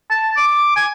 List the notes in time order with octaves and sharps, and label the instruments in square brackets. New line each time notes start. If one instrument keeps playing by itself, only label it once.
[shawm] A5
D6
G#5